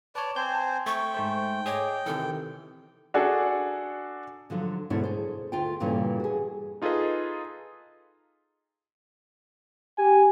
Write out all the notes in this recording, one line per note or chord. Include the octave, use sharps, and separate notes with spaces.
B4 C#5 D5 A5
C4 C5 G#5 G6
A3 G5 C#6
G#2 A3 C5
G#4 C#5 D#5 D6
C3 D#3 E3 A4
D4 F#4 G#4 A4
D3 F3 F#3 D4
D2 G#2 B2 D4 E4 C#5
G#4 C5
D2 F4 G5
G2 A#2 C#3 E3 A3 C#4
F#4 G#4
D#4 F4 G#4 A4 B4 D#5
G4 G#5